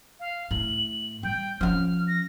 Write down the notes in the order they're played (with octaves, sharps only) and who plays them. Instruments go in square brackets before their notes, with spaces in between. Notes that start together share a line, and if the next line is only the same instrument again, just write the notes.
[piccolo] F5
[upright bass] A2 [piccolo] F#7
[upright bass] G3 [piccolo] G5
[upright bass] F3 C#4 [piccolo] F6
[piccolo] A#6